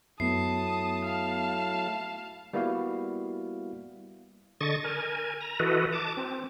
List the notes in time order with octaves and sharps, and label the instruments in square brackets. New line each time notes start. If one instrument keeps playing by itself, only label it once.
[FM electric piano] F#2 B3 [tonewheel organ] F#3 A3 E4 [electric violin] A5 D#6 [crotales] C7
[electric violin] F5 A5
[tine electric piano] G3 A#3 B3 E4 F#4 F5
[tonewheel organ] D3 D#5 C#6 A6
A#4 G#5
A#5
E3 F#4 A4 B4 D#5
A5 D6
C4